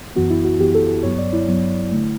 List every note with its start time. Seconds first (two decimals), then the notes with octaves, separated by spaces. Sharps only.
0.15 F#2 E3 B3 F#4
0.30 E4
0.45 F#4
0.59 F#2 E3 B3 G4
0.75 A4
0.88 A4
1.03 G2 F#3 B3 C#5
1.18 D5
1.33 E4
1.48 G2 F#3 B3
1.92 D3 A3